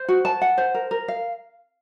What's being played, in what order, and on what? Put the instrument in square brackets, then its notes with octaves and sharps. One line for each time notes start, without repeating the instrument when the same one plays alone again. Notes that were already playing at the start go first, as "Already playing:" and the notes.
Already playing: [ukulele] C5
F#4
A5
F#5
C5
A#4
A#4
F5